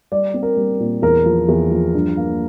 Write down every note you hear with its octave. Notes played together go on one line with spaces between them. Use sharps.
G3 D5
C4
A#4
G3
A#2
E2 A#4
F3
E2
F3
G2
A#3